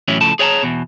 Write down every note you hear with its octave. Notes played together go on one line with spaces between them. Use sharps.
A2 E3 F#3 C#4 E4
A2 C#3 F3 A4 A5
G#4 C#5 D5 G5 A5 A#5
E2 B2